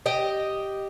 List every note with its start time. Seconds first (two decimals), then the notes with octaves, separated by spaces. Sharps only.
0.06 G4 D#5